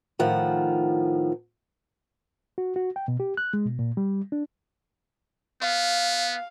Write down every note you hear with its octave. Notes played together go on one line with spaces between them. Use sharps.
A2 D#3 F3 F#5
F#4
F#4
G5
B2
G4
F#6
G#3
B2
A#2
G3
D4
B3 F5